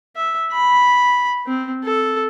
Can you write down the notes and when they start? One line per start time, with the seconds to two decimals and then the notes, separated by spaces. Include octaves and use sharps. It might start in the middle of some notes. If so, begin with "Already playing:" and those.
0.16 E5
0.52 B5
1.46 C4
1.84 A4